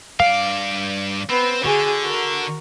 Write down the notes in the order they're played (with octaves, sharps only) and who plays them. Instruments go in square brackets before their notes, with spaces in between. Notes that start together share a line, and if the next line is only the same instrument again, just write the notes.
[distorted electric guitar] G2 D5 [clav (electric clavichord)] F5
[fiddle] B3 [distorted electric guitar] C4
[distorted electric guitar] D3 [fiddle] F#4 G#4
[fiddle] F#4 A#4